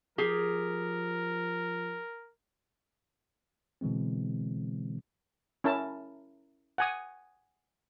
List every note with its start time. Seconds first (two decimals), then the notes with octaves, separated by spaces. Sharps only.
0.18 F3 G4 G#4 A#4
3.81 B2 D3 E3 G#3 C4
5.64 C#4 E4 A#4 A5
6.78 F#5 G#5 D#6